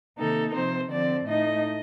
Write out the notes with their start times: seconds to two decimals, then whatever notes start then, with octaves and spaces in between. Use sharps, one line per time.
0.18 C3 D#3 A#3 D#4 A4
0.54 C3 F3 C4 C5
0.90 D3 F3 C4 D5
1.26 A2 A3 D#4 D#5